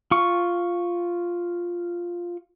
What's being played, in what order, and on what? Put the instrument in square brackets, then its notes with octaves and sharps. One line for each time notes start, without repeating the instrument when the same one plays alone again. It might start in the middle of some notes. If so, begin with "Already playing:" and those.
[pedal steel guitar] F4 C#6